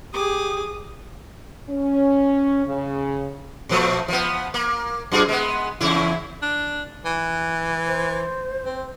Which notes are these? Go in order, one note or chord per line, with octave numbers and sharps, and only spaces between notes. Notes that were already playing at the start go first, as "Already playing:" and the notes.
G4 G#4 D6 D#6
C#4
C#3
A#2 F3 A3
F3 B3
A#3
F#2 F4 G#4
G#3 B3
E2 C#3 E4
D4
E3
C5
C4